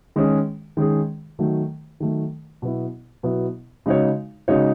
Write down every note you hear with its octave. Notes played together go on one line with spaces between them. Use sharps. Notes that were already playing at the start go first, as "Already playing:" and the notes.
D#3 G#3 C#4 G#4
D#3 G#3 C#4 G#4
D#3 F#3 A3
D#3 F#3 A3
B2 F#3 B3 E4
B2 F#3 B3 E4
C#3 G#3 D#4 F#4 C#5
C#3 G#3 D#4 F#4 C#5